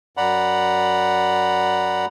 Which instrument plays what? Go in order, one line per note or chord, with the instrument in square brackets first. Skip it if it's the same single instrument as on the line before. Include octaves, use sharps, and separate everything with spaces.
[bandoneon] F#2 D5 F#5 A#5 B5